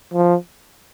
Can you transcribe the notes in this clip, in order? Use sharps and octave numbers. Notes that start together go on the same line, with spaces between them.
F3